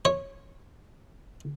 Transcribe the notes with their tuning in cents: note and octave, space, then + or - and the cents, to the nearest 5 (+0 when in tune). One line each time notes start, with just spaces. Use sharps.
C#5 -15